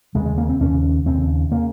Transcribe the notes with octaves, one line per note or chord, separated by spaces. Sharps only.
D#2 C#3 G#3
G#3
A#3
C4
D#2 C#3 C#4
D#2 C#3 C4
C#3 A#3